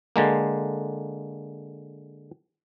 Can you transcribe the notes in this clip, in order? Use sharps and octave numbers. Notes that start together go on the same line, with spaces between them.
D3 G#3 A#3